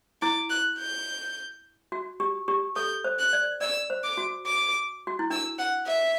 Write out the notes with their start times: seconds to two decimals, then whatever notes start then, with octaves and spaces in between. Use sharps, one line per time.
0.22 E4 D6
0.50 F#6
0.78 G6
1.92 F#4
2.20 G4
2.48 G4
2.76 A4 G6
3.04 C5
3.19 F#6
3.33 D5
3.61 D5 E6
3.90 C5
4.04 D6
4.18 F#4
4.46 D6
5.07 F#4
5.19 E4
5.30 D4 E6
5.58 F#5
5.87 E5